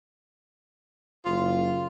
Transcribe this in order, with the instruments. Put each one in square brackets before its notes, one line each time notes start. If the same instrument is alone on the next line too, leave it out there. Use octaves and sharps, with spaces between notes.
[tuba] F#1 [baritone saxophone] F4